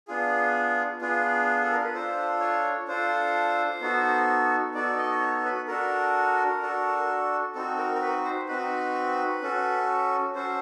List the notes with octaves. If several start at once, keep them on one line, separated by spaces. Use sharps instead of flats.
B3 D4 F4 G#4
B3 D4 F4 G#4
A4
A#4
B4
D4 F4 A4 C5
C#5
D4 F4 A4 C5
B3 D#4 F#4 A4
B3 D#4 F#4 A4 D5
D#5
C#5
B4
D4 F#4 A4 A#4
D4 F#4 A4
C4 D#4 F#4 A4
A#4
A#4
B4
C5
C4 D#4 F#4 B4
C#4 F#4 A4
C#4 F#4 A4 C5